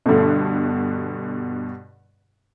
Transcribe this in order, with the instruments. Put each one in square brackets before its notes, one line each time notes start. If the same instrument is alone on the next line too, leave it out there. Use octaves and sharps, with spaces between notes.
[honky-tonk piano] G2 B2 [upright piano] D3 A3